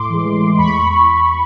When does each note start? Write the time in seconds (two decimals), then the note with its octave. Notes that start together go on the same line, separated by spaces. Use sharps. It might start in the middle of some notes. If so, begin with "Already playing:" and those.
Already playing: A2 C6 D6
0.09 E3 G#3
0.25 A2
0.42 E3 G#3
0.57 E2 B5 C#6